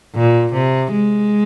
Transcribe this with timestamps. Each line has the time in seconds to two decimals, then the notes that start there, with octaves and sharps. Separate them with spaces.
0.15 A#2
0.53 C3
0.92 G#3